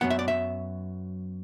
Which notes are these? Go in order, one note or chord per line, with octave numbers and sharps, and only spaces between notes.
F#2 F#3 B3 F#5
E5
D5
E5